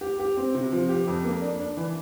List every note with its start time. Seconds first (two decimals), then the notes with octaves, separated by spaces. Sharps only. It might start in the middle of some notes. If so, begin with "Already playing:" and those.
0.01 G4
0.19 G4
0.37 C4
0.55 C3
0.72 F3
0.89 G4
1.07 F2
1.25 A#3
1.42 D4
1.60 D4
1.77 E3